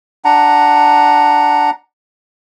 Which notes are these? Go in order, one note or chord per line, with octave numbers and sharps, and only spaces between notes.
D4 F#5 A#5